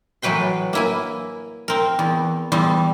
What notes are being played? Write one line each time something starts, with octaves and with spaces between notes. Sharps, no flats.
A2 E3 F#3 B4 G5 C6
A#3 E4 G#5
C4 A#4
E2
E2 G3 C4